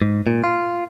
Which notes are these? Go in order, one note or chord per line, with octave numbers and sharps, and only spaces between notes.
G#2
A#2
F4